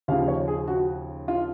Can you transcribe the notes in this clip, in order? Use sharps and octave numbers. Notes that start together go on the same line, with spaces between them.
D#2 C#3 F3 F5
C#5
G#4
F#4
F4